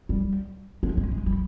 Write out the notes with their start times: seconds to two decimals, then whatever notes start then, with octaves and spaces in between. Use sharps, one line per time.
0.09 G3
0.83 G#3
0.97 G#3
1.12 G#3
1.26 G3